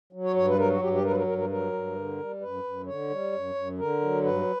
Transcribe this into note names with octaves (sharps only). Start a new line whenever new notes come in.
F#3
C#5
G2 C#5
B4
F#3 A#4
F#4
G2 G4
G4
F#3 A#4
B4
A#4
G2 A#4
A#4
F#3 A#4
G2
D3
G3
F#2 B4
F#2
D3 C#5
G3
F#2
F#2
D3 A#4
F#3
G2 B4